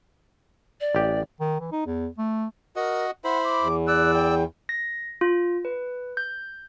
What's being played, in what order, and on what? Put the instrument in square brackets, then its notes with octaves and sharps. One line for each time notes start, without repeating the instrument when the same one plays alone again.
[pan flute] D5
[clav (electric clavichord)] A1 G4
[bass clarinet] D#3
E3
D#4
E2
A3
[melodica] F#4 D#5 [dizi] A#4
[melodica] E4 C5 B5 [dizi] F#5
[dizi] D6
[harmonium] E2
[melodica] D5 E6 [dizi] F#6
[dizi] G5
[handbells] A#6
F4
B4
G6